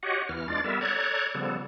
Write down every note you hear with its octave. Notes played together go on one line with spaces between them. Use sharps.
F#4 G4 C#5 D#5 F#5
E2 E3 F6
G#3 D4 F4 D5 A6
G3 B3 A4 A#4 E5
A4 C#5 D5 A#5 F#6 G#6
C#3 F3 G3 B3 A4